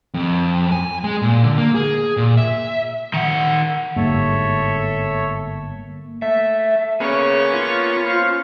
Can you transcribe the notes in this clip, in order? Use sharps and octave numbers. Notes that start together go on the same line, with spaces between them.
F2
G#5
G#3
A#2
D3
A#3
G#4
A#2
E5
D#3 F#5
G1 G#2 G3 A#3 A4 C#5 E5
A3 E5
A#3 B3 C#4 G#4 C#5 C#6
F4
C5 F5